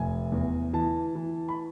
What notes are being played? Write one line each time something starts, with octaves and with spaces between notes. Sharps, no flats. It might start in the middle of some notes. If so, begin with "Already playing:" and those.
Already playing: F1 G#5
E2
E3 A5
E3
B5